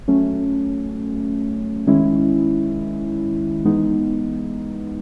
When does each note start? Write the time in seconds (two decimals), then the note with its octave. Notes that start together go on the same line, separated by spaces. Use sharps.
0.08 F#3 A3 C#4
1.87 D#3 G#3 C#4 E4
3.65 E3 G#3 B3 D#4